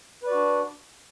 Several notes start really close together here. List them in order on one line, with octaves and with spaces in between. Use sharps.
B4 D5 F#4 D4